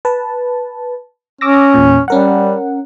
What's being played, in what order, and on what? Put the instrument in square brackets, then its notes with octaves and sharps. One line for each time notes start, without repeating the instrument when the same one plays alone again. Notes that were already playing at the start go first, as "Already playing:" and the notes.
[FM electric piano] B4 A5
[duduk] C#4 [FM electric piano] D6 E6 A#6
[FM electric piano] E2 A#2
[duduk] G3 [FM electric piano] C#4 A#4 F#5